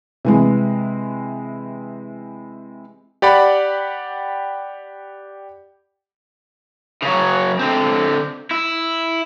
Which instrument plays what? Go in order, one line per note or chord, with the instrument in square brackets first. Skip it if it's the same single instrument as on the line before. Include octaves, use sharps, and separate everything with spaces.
[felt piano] C3 E3 G#3
[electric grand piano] G4 D5 F#5 B5
[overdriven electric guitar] C#3 F#3
D3 C4
E4